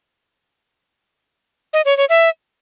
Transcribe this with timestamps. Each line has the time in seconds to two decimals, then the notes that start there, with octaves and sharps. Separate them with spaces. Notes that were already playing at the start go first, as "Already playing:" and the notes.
1.73 D#5
1.85 C#5
1.97 C#5
2.09 E5